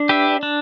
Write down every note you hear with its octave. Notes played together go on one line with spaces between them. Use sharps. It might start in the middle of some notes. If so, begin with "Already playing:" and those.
Already playing: D4
G4 B4 E5
D4